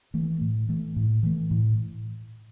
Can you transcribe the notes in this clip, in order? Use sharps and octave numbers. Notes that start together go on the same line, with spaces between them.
E3 A3
A2
E3 A3
A2
E3 A3
A2